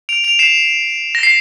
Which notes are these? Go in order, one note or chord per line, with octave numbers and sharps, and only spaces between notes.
D7 F7
D7 F7
C7 E7
A#6
C7